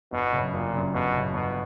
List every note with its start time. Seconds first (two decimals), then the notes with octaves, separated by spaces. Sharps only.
0.12 G1 B2
0.33 F#2 C#3
0.53 G1 A#2
0.74 F#2 C#3
0.94 G1 B2
1.14 F#2 C#3
1.34 G1 B2